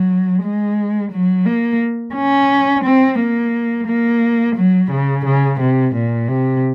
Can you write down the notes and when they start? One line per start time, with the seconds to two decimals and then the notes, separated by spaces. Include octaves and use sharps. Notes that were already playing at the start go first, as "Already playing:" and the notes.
Already playing: F#3
0.43 G#3
1.12 F#3
1.46 A#3
2.15 C#4
2.84 C4
3.19 A#3
3.87 A#3
4.56 F#3
4.91 C#3
5.25 C#3
5.60 C3
5.95 A#2
6.28 C3